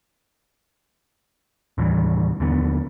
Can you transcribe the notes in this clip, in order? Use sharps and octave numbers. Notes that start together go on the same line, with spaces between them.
D#2 A2 E3 G3
D#2 D3 B3